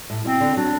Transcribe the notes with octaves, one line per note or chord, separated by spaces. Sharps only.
A2
B2 C4
D3
F#3 D4